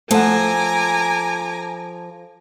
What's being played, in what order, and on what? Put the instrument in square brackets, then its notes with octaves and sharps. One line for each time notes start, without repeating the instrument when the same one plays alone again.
[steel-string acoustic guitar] F3 A4 [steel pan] A3 F#5 [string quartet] G#5 A#5 D6